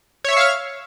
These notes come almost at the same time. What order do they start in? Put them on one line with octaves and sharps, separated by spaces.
C#5 E5 C#6 F5 F6